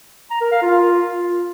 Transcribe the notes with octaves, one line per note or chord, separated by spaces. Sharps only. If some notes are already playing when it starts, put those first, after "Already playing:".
A#5
A#4
F5
F4